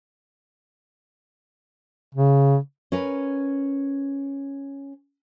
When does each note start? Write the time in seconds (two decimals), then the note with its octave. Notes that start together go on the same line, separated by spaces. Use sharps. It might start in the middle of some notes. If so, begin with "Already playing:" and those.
2.15 C#3
2.92 C#4 A#4 B4